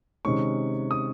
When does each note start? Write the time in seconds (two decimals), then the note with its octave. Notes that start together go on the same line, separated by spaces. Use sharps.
0.25 C3 D#3 G#3 C#4 C#6
0.91 D#6